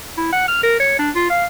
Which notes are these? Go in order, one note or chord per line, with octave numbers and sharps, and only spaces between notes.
E4
F#5
F6
A#4
C#5
D4
F4
F5